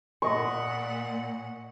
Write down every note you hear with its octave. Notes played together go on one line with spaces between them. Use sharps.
A#2 D#5 F#5 C#6